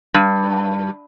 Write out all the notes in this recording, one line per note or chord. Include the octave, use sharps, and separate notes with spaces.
G2